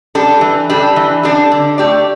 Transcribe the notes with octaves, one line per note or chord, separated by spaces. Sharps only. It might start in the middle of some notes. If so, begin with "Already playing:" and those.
G3 D4 A4
E3
G3 D4 A4
E3
G3 D4 A4
D3
A3 G4 D5